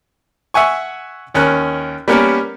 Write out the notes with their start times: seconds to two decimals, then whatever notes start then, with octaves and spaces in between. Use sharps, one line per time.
0.54 E5 F#5 G#5 C#6
1.34 D#2 C#4 A#4 F#6
2.08 G3 A#3 B3 C#4 A#4